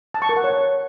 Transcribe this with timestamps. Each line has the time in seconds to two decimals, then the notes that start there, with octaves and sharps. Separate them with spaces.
0.14 A5
0.22 C#6
0.29 A#4
0.37 F#5
0.44 C#5